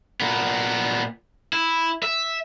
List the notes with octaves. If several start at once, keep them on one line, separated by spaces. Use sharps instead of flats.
A#2 B3
E4
E5